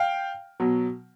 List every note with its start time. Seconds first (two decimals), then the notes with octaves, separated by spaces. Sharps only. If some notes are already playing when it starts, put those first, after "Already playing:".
Already playing: F5 G5
0.60 B2 F#3